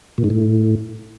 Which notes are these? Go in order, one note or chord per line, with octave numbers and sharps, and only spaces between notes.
A#2
G#2
A2